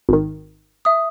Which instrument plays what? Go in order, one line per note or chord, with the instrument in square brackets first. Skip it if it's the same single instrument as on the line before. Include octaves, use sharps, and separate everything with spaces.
[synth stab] G#1 D#3
[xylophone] E5 D#6